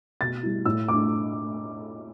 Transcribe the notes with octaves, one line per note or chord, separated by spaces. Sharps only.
B2 A6
G3 E4
A2 E6
A3 D4 D6